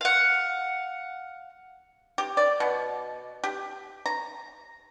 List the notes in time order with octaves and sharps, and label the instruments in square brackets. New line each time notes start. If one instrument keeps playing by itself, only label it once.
[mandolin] F5 F#5
[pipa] G4
D5
B2
G4
A#5